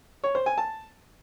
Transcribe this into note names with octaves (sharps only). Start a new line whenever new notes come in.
C#5
C5
G#5
A5